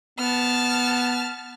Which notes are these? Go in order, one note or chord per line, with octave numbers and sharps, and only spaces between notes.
B3 A5 F6